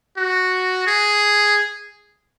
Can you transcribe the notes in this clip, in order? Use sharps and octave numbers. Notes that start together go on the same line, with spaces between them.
F#4
G#4